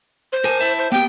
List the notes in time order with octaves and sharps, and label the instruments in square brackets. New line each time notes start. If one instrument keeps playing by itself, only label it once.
[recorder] C5
[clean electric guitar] A#4 G#5 A5
E4 E5 A5
[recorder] C5
[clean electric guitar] A#3 B3 G4 [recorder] G5